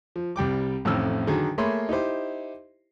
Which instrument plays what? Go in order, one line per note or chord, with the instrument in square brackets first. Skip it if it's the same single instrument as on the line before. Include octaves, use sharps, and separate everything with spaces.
[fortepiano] F3
C2 G3 G5 D6
A1 F2 A2 D#3 E6 F6
D3 D#3 F#3 G#4
A3 A#3 G#4 C#5 B5 C6
D#4 E4 G4 C5